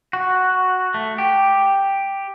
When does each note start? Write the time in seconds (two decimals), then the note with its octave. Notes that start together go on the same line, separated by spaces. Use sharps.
0.13 F#4
0.94 A3
1.18 G4